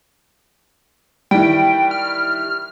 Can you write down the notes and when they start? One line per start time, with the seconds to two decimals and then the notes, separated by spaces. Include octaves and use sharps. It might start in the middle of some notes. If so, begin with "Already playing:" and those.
1.31 D#3 E3 G3 G5
1.91 F6